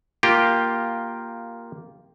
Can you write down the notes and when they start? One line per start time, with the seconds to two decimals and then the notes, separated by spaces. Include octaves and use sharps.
0.23 A#3 F4 G4 G5